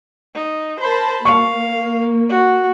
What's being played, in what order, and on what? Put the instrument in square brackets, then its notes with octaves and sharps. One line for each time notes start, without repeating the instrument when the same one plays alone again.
[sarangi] D#4
[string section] A#4 A5 B5 [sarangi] C5
[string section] A#3 [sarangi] F5 [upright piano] C#6
[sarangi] F#4